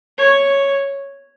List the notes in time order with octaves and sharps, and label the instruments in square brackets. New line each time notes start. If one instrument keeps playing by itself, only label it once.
[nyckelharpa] C#5